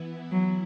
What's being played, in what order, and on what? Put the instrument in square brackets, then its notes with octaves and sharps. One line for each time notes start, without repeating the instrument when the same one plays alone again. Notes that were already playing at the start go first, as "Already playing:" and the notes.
Already playing: [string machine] E3 B3 E4
[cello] F#3